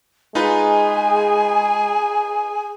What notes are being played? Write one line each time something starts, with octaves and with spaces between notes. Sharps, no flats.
G#3 D#4 F4 G#4 B4 G#5